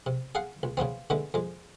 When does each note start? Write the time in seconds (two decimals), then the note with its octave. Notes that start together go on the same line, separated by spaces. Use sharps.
0.06 C3
0.35 G#4 F5 F#5 C6
0.63 C#2
0.77 C#3 E3 B3 C4
1.10 D3 G#3 B3 E4
1.34 F2 G#3